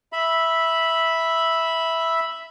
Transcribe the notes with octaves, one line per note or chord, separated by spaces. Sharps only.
E5 B5